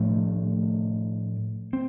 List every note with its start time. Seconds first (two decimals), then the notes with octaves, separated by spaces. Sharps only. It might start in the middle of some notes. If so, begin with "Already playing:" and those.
Already playing: A2 F3 A3 D4
1.73 C4